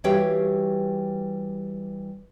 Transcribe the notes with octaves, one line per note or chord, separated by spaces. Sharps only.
E3 G3 F#4 G4 C#5 F5